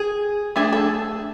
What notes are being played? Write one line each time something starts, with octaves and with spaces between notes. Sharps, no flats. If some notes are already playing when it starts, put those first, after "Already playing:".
Already playing: G#4
A3 D4 G#4
A4